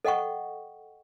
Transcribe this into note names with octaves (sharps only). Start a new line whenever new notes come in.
A4 D#5 F#5 G5 C#6